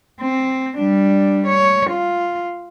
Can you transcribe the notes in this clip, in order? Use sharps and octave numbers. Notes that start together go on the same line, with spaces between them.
C4
G3 D4
C#5
F4